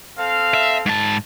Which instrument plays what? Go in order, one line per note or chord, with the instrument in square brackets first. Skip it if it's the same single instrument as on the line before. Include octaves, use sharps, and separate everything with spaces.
[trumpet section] C4 A4 F5
[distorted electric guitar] E5
G#2 A5